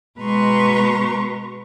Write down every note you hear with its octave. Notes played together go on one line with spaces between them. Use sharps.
B2 G#3 B4 A#5 C6 C#6